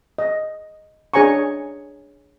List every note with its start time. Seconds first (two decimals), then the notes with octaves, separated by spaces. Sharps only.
0.18 D#5
1.14 D4 G#4 C#5 G#5 A#5 C#6